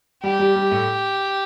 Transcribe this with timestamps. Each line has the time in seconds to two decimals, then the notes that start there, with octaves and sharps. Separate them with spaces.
0.24 G3 G4
0.39 G3
0.56 G3
0.71 A2 A3